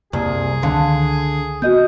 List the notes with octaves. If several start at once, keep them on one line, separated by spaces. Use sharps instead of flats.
C2 F#2 C3 A#3 G#4
C#2 D3 D#3 F5 C6
B3 F#4 D#5 D#6 G6